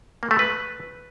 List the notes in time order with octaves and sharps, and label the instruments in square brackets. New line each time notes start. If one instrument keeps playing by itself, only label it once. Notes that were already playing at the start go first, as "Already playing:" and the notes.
[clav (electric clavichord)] A#3
A3
B4